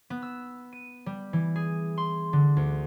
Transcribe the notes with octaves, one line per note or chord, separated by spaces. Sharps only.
B3
E6
D#7
G3
E3
G#4
C6
D3
D2